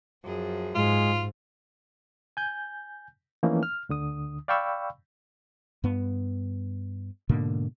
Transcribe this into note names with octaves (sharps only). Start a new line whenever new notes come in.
F#2 F3 G#4
G#2 G#3 F4
G#5 G6
E3 F3 A3 A#3 C#4 D#4
F6
D2 D3 D#6
D5 F5 G5 B5 C#6 E6
G2 B3
G#2 B2 D3 A#3